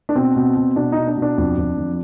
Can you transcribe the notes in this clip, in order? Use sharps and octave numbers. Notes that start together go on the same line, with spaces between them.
D4
B2 C4
B2
B2
B2 D4
B2 D#4
D4
B2
D4
F2
F2
F3